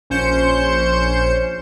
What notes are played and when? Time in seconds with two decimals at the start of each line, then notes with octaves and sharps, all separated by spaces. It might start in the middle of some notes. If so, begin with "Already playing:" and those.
0.10 A#1 C#4 C5 G6 C#7 E7